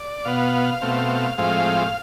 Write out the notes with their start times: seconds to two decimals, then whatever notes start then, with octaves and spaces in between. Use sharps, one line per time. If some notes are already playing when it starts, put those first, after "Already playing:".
Already playing: D5
0.25 B2 B3 F5
0.81 B2 A3 C4
1.38 A2 F3 G#3 C4 F5